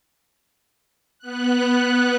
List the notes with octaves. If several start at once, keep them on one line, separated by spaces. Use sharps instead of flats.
B3 F#6